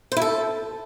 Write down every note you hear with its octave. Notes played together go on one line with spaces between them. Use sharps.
C5
E4
A4